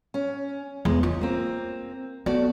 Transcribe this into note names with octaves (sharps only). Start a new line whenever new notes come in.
C#4
E2 G#3
C#3 F4
A#3 C4
A3 B3 F#4 D5